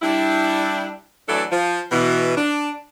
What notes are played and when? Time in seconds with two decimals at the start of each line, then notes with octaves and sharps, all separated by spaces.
0.02 G3 D4 E4
1.28 E3 F#3 A3 D4 A4 D5
1.51 F3
1.91 B2 E3
2.36 D4